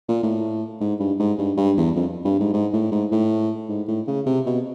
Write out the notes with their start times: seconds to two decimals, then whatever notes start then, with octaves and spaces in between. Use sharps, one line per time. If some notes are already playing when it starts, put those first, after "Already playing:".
0.09 A#2
0.23 A2
0.81 G#2
1.00 G2
1.19 G#2
1.38 G2
1.57 G2
1.77 E2
1.96 F2
2.25 G2
2.40 G#2
2.54 G#2
2.73 A2
2.92 G#2
3.12 A2
3.69 G#2
3.88 A2
4.08 C#3
4.26 C3
4.46 B2